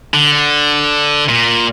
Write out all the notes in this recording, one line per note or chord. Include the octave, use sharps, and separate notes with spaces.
D3
A#2